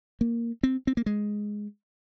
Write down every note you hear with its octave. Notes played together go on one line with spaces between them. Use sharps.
A#3
C4
C4
A#3
G#3